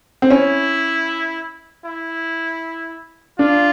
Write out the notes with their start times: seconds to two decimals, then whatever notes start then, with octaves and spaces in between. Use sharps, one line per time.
0.22 C4
0.30 C#4 E4
1.85 E4
3.39 D4 F4